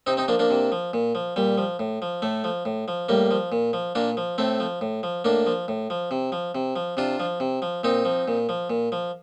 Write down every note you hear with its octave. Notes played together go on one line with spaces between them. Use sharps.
C3 C4 D#4
C4 D#4
F3 A#3 D4
A#3 D4
C3
F3
A#2
F3
A#2 G3
F3
A2
F3
A2 A3
F3
A2
F3
A2 G3 A#3
F3
A#2
F3
A#2 A#3 D4
F3
A2 A3 C4
F3
A2
F3
A2 A#3 D4
F3
A2
F3
C3
F3
C3
F3
C3 D4 F4
F3
C3
F3
A#2 C4 D#4
F3
A#2
F3
A#2
F3